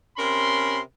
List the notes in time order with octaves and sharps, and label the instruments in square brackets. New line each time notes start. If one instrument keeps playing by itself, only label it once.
[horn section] C3 C#4 A#4 B5 C6